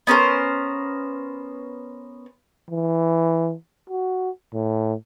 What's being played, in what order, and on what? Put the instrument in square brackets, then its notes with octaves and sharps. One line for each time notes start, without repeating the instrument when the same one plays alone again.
[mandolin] B3 C#4 A#4 C5
[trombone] E3
F#4
A2